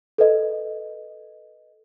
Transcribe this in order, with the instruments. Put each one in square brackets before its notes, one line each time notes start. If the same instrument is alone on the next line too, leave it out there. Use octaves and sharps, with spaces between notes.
[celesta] A4 B4 D#5